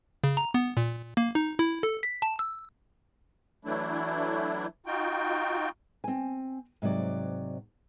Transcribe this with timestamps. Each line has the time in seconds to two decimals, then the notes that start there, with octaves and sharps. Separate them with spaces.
0.24 C#3
0.37 A#5
0.54 B3
0.77 A#2
1.17 A#3
1.35 D#4
1.59 E4
1.83 A4
2.03 B6
2.22 A5
2.39 E6
3.65 E3 F#3 A3 D4 E4
4.86 D#4 F4 F#4 G5
6.04 C4 G#5
6.82 G#2 C3 F#3 D5